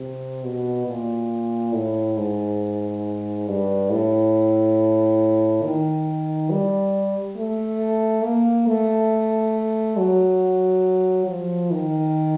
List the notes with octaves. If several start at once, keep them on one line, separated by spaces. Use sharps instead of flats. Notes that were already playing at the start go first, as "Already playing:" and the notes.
Already playing: C3
B2
A#2
A2
G#2
G2
A2
D#3
G3
A3
A#3
A3
F#3
F3
D#3